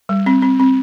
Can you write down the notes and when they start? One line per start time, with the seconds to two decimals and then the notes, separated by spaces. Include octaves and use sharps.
0.09 G3
0.26 C4
0.42 C4
0.60 C4